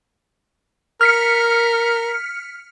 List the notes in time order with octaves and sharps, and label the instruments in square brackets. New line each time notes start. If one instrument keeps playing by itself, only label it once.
[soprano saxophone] A#4 [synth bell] F6 B6 C#7